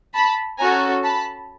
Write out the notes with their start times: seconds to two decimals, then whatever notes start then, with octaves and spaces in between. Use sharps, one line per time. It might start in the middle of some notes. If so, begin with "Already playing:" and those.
0.14 A5 B5
0.58 C#4 F#4 A4 G#5 A#5
1.03 A5 B5